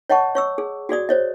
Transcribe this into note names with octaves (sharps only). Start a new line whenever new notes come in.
C#5 D#5 F#5 A5 C#6
C#5 C#6 E6
G#4
F#4 G#4 D5 D#6
C5 C#5 D#5